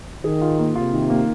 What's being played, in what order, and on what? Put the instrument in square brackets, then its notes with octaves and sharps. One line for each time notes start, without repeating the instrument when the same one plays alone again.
[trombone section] D#3 [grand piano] G#4
[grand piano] F4
A#3
[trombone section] C3 [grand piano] F4
[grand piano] D#3
A#3